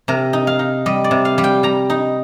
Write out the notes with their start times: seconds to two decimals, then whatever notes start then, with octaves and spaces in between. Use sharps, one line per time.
0.08 C3 A#4
0.33 D#4
0.47 F5
0.59 D#4
0.86 G3 D#5
1.04 D5
1.11 C3
1.25 F5
1.38 G3
1.44 G5
1.63 G3 A#5
1.90 D#4